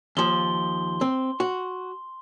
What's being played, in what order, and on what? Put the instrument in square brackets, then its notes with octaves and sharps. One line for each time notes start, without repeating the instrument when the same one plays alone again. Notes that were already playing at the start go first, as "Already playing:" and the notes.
[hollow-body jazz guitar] D#2 F3 [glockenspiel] C6 G7
[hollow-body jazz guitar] C4
F#4